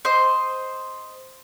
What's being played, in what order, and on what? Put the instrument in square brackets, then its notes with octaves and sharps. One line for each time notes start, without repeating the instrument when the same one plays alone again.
[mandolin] C5 D#5